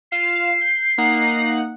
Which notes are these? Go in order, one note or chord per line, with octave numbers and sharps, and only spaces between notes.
F4 F5 C7 E7
G6
A#3 D#4 F#5